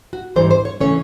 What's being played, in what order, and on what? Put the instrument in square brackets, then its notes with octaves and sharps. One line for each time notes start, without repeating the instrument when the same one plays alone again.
[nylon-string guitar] F#4
G#2 E3 G3 C5
C5
C#5
C#3 E3 A3 C#4 C#5